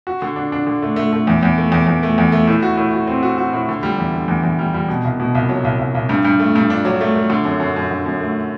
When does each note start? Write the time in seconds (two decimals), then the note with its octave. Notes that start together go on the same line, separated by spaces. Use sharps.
0.07 F#4
0.22 D3
0.36 D4
0.52 D4
0.67 D3
0.82 A3
0.96 A3
1.13 A3
1.27 E2
1.43 E2
1.58 A3
1.72 E2
1.87 E2
2.03 A3
2.18 E2
2.32 A3
2.47 A2
2.63 F#4
2.77 A2
2.94 F#4
3.07 C4
3.23 F#4
3.38 F#4
3.53 A2
3.69 D3
3.83 G3
3.98 E2
4.14 D3
4.28 E2
4.43 E2
4.59 G3
4.74 G3
4.88 B2
5.05 C2
5.20 B2
5.35 C2
5.49 F#3
5.65 C2
5.79 C2
5.95 C2
6.09 G2
6.25 G2
6.39 A3
6.55 G2
6.70 D4
6.85 F#3
7.01 A3
7.15 A3
7.30 D3
7.45 F#2
7.60 F#2
7.76 F#2
7.91 D3
8.06 F#2
8.20 A3